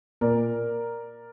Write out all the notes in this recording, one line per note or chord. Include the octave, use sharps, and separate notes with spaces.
A#2 A#4 D5